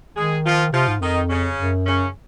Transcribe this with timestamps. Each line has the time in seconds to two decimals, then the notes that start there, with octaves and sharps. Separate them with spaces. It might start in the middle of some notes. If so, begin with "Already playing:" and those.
0.16 D#3 G#3 G#4
0.45 F3 F4
0.72 C3 F3 F4
0.88 G#2
1.01 F2 D#3 D#4
1.29 C#3 C#4
1.58 F#2
1.86 C#3 C#4